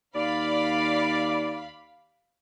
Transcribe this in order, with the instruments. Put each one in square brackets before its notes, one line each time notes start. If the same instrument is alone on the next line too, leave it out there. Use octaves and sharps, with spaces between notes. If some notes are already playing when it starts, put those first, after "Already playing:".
[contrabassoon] D#2 [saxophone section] D5 [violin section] F5 B5